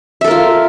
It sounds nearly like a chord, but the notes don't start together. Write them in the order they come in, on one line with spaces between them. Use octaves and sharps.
E5 A4 A#4 F4